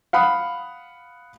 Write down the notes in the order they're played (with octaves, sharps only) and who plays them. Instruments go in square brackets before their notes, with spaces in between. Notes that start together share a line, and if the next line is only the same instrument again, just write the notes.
[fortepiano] F5 F#5 B5 D#6